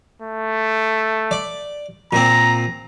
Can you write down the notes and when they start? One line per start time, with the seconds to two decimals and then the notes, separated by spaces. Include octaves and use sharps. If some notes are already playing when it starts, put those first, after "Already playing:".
0.22 A3
1.31 D5
2.13 A#2 C4 A#5